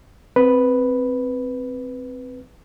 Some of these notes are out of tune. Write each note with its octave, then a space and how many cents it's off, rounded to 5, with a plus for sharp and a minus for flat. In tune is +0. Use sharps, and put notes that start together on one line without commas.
C4 +0 B4 +0